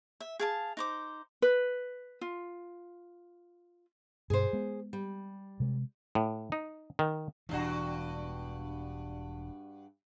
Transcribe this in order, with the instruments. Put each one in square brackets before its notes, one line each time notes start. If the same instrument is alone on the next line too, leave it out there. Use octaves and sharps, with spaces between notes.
[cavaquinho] E5
G#4 F5 A5
D#4 C5 D6
[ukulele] B4
F4
[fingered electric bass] G2 B2 [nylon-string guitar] G#4 C5
[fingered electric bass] G#3 B3
[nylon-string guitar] G3
[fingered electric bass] C3 G#3
[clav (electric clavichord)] A2
D#4
D#3
[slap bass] E1 E3 [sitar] G2 D4 F#4